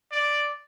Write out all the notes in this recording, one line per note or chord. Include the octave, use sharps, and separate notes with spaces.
D5